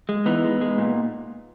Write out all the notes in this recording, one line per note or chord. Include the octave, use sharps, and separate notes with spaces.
G#3
E3 B3 D#4
G#3
G#3
A#2